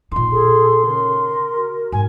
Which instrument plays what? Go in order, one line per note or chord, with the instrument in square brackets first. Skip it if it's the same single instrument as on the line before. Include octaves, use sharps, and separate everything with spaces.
[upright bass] A#2 D#4 [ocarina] C6
[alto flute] G#4 [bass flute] A4
[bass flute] C#3 [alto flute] A#4
[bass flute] F#4
[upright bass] G#2 [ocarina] G#5